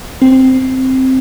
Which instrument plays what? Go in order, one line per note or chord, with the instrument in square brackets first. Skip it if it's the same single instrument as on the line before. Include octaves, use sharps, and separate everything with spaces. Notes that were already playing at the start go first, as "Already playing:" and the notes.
[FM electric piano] C4